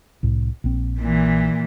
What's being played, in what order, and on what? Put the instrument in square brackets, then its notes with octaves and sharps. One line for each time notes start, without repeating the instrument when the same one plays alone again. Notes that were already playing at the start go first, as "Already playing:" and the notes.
[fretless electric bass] C2 A2
A#1 C4
[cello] A#2 E3